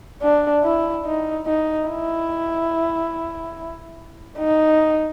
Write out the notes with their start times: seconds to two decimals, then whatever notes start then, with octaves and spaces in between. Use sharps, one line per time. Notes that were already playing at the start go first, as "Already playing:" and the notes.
0.22 D4
0.64 E4
1.05 D#4
1.47 D#4
1.89 E4
4.38 D#4